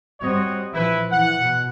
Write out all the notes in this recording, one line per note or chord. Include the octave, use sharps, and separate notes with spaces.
G3 C4 F#4 C#5 D#5
A#1 E3 F3 E4 B4
E3 F#5
B2